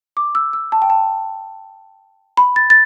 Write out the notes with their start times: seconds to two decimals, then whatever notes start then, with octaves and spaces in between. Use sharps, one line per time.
0.17 D6
0.35 E6
0.53 E6
0.72 A5
0.82 G5
0.90 A5
2.37 B5
2.56 A6
2.70 A6